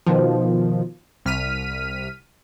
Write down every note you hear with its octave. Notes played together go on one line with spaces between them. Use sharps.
B2 D#3 F3
C2 F6 B6 D#7